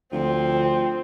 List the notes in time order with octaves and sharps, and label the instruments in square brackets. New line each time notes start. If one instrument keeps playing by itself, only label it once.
[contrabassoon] D2 [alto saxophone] F3 [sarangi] C4 [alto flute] G5